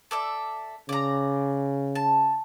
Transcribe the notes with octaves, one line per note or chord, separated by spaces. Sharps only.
A4 D5 E5
C#3 D5 A#5
A5